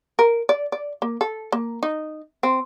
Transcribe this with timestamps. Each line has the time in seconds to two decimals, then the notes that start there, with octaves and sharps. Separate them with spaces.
0.19 A#4
0.49 D5
0.72 D5
1.02 A#3
1.21 A4
1.52 A#3
1.83 D#4
2.43 C4